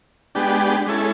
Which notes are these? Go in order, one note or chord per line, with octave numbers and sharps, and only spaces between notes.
G#3 B3 D4 G4
G#3 C#4 E4 A4